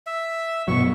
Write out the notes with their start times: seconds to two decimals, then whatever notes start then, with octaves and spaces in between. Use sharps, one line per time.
0.07 E5
0.68 G2 B2 F#3 C#6